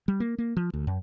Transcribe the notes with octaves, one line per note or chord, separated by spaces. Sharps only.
G3
A#3
A#3
F3
D2
F#2